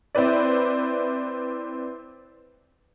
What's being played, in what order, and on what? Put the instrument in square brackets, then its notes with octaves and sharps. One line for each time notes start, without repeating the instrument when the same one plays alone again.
[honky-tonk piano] C4 E4 B4 D5